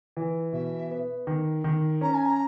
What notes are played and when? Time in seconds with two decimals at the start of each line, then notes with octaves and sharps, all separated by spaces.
0.17 E3
0.53 B2 E5
0.91 B3
1.27 D#3
1.64 D#3
2.01 C#4 A#5
2.14 G#5
2.26 A#5